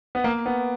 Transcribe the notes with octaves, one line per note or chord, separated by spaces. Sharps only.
B3
A#3
B3